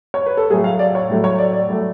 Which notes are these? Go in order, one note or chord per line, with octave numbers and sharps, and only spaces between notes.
C#5
B4
A4
A2 F#3 A3 G#4
F5
D5
C#5
A2 F#3 A3
C#5
D5
D5
A2 F#3 A3